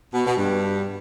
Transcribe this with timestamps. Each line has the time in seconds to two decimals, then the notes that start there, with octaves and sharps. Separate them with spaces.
0.14 B2
0.26 B2
0.37 G2